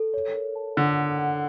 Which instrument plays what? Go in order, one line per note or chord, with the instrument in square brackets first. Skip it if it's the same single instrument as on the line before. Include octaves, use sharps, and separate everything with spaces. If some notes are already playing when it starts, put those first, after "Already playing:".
Already playing: [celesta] A4
C#5
A#4
A5
[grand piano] D3 [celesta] F#5
[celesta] F#5
F#5